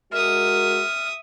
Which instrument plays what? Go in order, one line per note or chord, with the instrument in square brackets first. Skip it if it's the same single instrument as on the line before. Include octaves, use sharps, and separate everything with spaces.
[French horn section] G#3 F#4 A#4 [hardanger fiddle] E5 D#6 [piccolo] F6